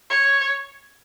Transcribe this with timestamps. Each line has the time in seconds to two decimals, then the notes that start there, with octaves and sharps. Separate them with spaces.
0.10 C#5